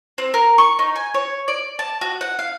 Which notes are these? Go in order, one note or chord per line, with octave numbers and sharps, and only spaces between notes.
C4
A#4
C#6
D#4
G#5
C#5
D5
A5
F#4
F#5
F5